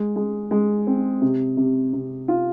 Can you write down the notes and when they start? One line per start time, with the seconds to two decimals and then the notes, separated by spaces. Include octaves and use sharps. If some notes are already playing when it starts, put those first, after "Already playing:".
Already playing: G#3
0.16 G#3
0.51 G#3
0.87 C4
1.22 C3
1.57 C3
1.93 C3
2.28 F4